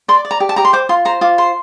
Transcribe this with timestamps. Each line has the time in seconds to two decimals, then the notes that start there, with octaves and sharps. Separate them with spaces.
0.08 D5 C6
0.25 D5
0.31 A#5
0.40 G4
0.49 A5
0.56 G4 A#5
0.65 C6
0.73 C5 D6
0.89 F4 C6
1.05 C5 A#5
1.21 F4 D6
1.38 C5 C6